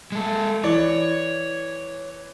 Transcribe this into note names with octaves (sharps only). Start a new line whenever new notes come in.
G#3 A4
E3 C#5 D5